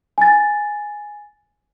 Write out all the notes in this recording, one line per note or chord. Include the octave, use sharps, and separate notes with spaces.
G#5 A6